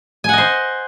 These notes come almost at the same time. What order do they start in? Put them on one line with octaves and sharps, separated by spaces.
G#5 F#5 D#5 C5